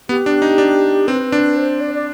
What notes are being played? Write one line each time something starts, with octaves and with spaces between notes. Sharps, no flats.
B3 G4
D4
D#4
D4
C4 B4
D4
C5
D5
D5